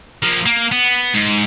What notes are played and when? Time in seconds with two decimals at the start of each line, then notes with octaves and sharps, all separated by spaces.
0.23 F3 A#3
0.46 A#3
0.72 B3
1.14 G#2